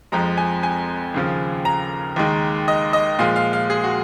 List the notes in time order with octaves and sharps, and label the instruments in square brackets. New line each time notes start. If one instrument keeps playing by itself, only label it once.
[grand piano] F2 F3 G#3 A#5
G#5
G#5
D#2 C#3 F3
A#5
D#2 D#3 G#3
D#5
D#5
A#2 F3 G#3 F5
F5
F5
G#4
F#4